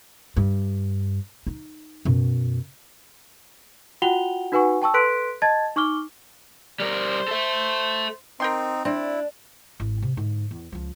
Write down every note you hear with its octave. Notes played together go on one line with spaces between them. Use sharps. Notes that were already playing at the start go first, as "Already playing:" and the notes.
G2
D#4
F#2 B2
F4 F#4 F#5 G5 F7 G7
D#4 F#4 B4 F#5 G#5 C#6
G5 A5 C#6 E6
A4 B4 C6 F#6 B6 D7
D#5 A5 G#6 A6
D#4 C#6 D6 F6 G7
G3 A#4 C5
A4 E5
C4 D#4 A#4 G5 C6
C4 D4 E4
G#1 E4
C3
G#2 D3
E2
C#2 F3